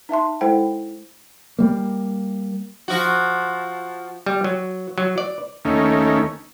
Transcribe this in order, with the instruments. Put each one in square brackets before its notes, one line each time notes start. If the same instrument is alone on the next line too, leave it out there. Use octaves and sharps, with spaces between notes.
[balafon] D#4 E5 A5 C6
G#3 E4 A4 C5 F#5 G5
[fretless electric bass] G3 A#3
[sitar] F3 F#4
[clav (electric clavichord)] G3
F#3
F#3
D5
[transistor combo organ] D#2 A3 C#4 D#4